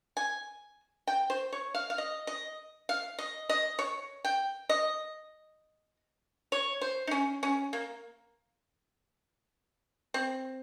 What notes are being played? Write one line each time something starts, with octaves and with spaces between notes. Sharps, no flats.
G#5
G5
C5
C#5
F5
F5
D#5
D#5
F5
D#5
D#5
C#5
G5
D#5
C#5
C5
D#4
C#4
C#4
A#3
C4